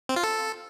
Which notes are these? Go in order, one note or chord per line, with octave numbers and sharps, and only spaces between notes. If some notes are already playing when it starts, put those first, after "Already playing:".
C4
F4
A4